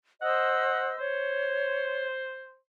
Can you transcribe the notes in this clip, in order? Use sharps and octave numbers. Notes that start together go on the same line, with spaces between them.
C5 D#5 F#5 E6
C5 C#5